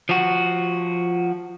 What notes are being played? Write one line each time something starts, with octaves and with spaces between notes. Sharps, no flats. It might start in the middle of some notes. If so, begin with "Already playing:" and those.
F3 F#4